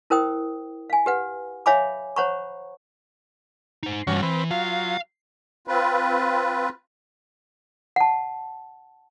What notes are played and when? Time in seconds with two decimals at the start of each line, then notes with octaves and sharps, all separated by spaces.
0.10 E4 A#4 C5 G5 D#6
0.90 F5 G#5
1.06 G4 B4 F#5
1.66 C#5 E5 F5 G#5 B5 D6
2.16 C5 C#5 F#5 A#5 B5 C#6
3.83 D#4 C5
4.07 G2 E3 G3 C#4 F#4
4.23 E3 C4 B4
4.51 F#3 F4 F5
5.68 C4 F4 B4
7.96 F#5 A5